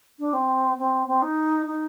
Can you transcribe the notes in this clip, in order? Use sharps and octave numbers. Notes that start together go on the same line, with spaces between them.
D4
C4
C4
C4
D#4
D#4